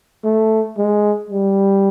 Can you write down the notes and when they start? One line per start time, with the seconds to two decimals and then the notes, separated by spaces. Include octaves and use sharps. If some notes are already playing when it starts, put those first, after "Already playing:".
0.24 A3
0.78 G#3
1.31 G3